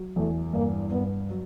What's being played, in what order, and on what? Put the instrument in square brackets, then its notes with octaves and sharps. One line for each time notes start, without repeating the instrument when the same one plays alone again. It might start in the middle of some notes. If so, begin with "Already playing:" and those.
Already playing: [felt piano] F#3
[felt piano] E2 [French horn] A3
[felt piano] G2 [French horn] A#3
[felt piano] G2 [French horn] B3
[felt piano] F#3